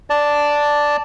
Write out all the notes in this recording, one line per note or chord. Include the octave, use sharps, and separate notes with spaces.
D5 A5